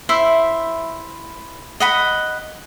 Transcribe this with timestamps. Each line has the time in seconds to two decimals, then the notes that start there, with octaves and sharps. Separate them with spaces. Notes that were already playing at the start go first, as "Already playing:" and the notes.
0.09 E4 C5 E5
1.80 D#5 F#5 B5